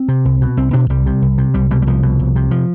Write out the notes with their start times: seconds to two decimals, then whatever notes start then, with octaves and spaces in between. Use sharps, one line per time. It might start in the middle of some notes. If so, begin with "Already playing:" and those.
Already playing: C4
0.08 C3
0.25 C2
0.41 B2
0.57 C2 C4
0.73 B2 D4
0.90 C2 G3
1.06 C3
1.22 C2
1.38 C3
1.54 C2 G3
1.71 B2 G3
1.82 G3
1.87 C2 F3
2.03 B2
2.19 C2
2.36 C3
2.51 F3